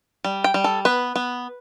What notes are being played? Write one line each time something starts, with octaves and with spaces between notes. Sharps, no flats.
G3
G5
G3
A4
B3 B4
B3